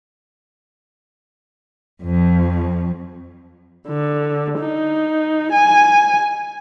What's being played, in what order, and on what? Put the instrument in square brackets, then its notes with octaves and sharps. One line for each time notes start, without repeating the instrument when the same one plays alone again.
[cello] F2 F3
[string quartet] D3
D#4
G#5